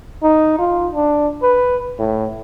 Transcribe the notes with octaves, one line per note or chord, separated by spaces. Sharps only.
D#4
F4
D4
B4
A2